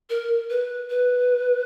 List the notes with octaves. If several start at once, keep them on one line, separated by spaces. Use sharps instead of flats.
A#4
B4
B4